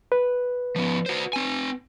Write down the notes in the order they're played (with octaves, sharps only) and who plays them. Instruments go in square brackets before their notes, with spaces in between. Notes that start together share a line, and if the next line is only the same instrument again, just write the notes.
[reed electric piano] B4
[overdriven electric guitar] F3 B3
F#4 C5
C4 G#5